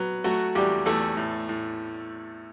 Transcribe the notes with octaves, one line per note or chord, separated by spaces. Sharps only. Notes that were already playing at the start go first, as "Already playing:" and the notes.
Already playing: F#3 B3
F#3 A3 F#4
E2 G3 G4
E2 A3 A4
A2
A2